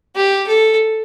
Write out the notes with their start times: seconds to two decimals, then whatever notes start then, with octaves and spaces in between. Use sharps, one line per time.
0.16 G4
0.47 A4